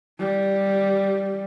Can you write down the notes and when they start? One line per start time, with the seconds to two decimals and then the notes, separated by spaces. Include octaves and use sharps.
0.19 G3